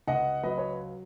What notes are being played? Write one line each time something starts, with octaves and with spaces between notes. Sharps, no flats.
C#2 D#5 F#5
F#3 B4 D#5
C#5